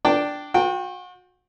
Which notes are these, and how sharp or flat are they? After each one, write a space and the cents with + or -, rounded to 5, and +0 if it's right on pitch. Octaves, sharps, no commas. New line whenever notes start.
D4 +0 D5 +0 G5 -10
F#4 -35 G5 +0